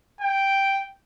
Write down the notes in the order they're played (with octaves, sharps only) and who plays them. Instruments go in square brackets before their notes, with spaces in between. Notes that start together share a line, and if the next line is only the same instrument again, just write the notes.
[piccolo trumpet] G5